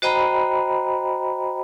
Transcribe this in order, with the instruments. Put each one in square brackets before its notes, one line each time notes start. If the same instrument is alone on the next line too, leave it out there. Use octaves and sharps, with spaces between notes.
[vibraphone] F#4 C5 D#5 G5 A#5 B5